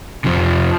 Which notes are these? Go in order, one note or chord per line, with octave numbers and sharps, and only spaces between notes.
F2 C3 F3